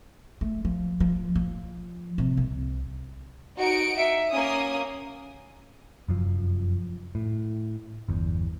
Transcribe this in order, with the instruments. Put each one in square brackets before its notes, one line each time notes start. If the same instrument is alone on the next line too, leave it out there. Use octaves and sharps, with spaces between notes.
[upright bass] A3
F3
F3
F3
C3
C2
[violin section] D#4 C#7 D7 [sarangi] F#4
[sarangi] E5
[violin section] A#3 D#6 [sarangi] C#4
[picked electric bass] F1 F#2 F3
A2
G1 E2